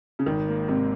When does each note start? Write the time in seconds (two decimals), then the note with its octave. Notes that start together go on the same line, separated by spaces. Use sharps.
0.19 C#3
0.26 G#1 D#3
0.48 A#3
0.68 G#2 C3